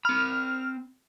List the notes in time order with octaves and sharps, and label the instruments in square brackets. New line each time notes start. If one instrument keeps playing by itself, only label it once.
[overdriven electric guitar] C4 B5 [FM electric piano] F6